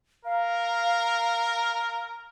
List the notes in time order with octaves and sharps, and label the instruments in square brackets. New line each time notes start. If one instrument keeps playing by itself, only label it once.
[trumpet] A#4 [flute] F5